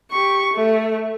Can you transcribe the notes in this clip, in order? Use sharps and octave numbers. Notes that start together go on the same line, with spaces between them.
G4 C#6
A3